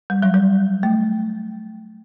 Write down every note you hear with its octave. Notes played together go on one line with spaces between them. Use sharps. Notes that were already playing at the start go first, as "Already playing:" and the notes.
G3
F#3
G3
A3